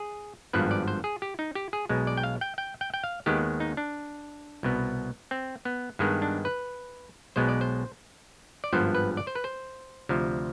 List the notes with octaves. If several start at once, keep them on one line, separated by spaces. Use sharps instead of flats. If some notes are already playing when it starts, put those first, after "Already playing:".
Already playing: G#4
G#1 G2 F3 B3 B4
D5
C5
G#4
G4
D#4
G4
G#4
B1 B2 G#3
D5
G5
F5
G5
G5
G5
G5
F5
D#2 D#3 G#3 B3 G4
D#4
D4
C2 B2 B3
C4
B3
G2 D#3 G#3 B3
D4
B4
B1 B2 G#3 B3 C5
D5
C5
D5
G#1 G2 F3 B3 C5
B4
D5
C5
B4
C5
D2 C3 F3